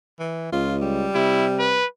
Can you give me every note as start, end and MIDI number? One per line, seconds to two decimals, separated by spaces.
0.19 0.50 52
0.52 1.09 37
0.52 0.76 65
0.82 1.84 55
1.15 1.78 48
1.15 1.46 64
1.59 1.85 71